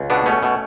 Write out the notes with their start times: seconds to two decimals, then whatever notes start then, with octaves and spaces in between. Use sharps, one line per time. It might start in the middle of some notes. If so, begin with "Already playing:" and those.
Already playing: C#2
0.10 B2 B3 D4
0.26 B2 A3 C#4
0.43 B2